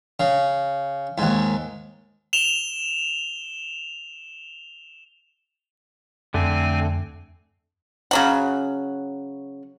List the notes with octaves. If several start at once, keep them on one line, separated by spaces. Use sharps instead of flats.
C#3
D#2 G#2
E7 F7 G7
F2 D3 A3 C4 G#5
C#3 F#3 F#5